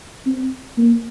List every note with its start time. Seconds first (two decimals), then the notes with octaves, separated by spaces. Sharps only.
0.26 C4
0.78 A#3